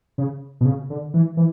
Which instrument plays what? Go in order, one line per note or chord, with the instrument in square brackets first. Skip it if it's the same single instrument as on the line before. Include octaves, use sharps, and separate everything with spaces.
[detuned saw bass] C#3
B2
C#3
D3
E3
E3